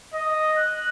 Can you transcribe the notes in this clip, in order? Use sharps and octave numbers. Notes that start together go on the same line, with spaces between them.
D#5
F#6